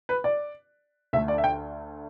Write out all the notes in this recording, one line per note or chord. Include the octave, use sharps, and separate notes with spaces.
B4
D5
D2 D3 A3 E5
D5
E5
G5